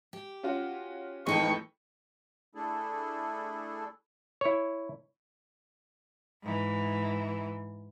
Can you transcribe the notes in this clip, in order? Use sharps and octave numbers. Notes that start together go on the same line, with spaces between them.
G4
C#4 F4 F#4
F2 A2 E3 G#3 D#4 A4 G5 C#6
A3 D4 E4 G#4 A4
E4 C#5
G#2 E3